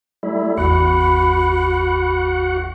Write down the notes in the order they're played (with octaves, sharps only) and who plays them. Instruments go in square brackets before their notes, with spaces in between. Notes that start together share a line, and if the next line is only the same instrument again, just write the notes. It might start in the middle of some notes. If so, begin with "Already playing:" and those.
[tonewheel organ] G3 A3 E4
[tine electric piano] G#1 E2 [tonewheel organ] F#4 F#5 [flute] B5